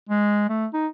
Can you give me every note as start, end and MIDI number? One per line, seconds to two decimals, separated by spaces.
0.09 0.49 56
0.49 0.66 57
0.74 0.87 63